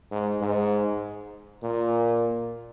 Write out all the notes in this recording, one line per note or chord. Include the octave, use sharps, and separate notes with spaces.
G#2
G#2
A#2